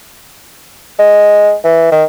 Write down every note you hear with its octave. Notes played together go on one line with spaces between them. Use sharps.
G#3
E3
D#3